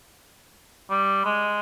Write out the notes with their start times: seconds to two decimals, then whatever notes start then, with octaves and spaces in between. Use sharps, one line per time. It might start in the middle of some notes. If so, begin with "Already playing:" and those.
0.90 G3
1.25 G#3